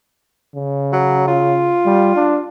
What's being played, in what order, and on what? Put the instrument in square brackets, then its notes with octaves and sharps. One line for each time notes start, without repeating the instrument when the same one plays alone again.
[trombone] C#3
[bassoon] F#3
F4
[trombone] G3
D4